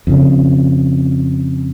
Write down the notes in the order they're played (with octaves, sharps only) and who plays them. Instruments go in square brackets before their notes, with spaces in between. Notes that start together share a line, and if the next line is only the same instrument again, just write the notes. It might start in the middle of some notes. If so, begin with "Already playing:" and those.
[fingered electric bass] F2 C#3